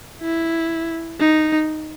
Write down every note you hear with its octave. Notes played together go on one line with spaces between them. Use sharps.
E4
D#4